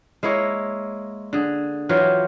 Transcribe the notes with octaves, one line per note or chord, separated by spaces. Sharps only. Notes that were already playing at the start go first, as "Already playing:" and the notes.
G#3 A#3 E4 C#5
D3 G#4
E3 F#3 F4 G4